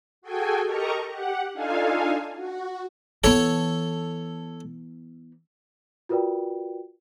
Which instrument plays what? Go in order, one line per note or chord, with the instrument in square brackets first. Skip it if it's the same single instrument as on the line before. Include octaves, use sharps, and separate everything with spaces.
[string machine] F#4 G#4 A4 G5 G#5
G4 A4 A#4 D#5 A#5 C#6
G4 F#5
D4 D#4 F4 A4 F5 G#5
F#4
[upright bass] E3 B3 [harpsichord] A4 C#5
[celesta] F4 F#4 A#4 B4 D5 G5